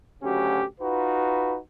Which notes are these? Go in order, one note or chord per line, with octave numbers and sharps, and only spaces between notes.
D2 C#3 F#3 C#4 G4
D#4 F4 F#4 B4